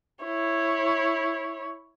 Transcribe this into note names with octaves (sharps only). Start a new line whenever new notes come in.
E4 C#5